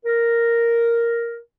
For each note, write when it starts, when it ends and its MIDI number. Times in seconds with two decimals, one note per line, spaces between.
0.06 1.36 70